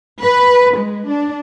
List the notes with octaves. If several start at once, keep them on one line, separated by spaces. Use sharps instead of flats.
B4
G#3
D4